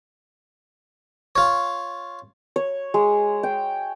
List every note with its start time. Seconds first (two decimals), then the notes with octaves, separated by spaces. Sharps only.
1.36 F4 C#5
2.56 C#5
2.94 G#3
3.43 G5